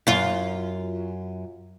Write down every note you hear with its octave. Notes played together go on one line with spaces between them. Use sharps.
F#2 F4